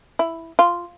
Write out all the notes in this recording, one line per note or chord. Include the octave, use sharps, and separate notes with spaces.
E4
F4